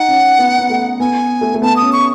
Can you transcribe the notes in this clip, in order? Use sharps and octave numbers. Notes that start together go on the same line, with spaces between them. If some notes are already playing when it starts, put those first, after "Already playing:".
Already playing: D#4 F#5
C#4
B3
B3
A3
B3 G#5
A3
A3
B3 A5
D#6
C#4
C#6